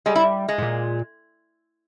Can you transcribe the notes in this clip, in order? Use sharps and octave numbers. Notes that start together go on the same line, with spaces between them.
G3 G#3
E4
G#3
G#2
A#2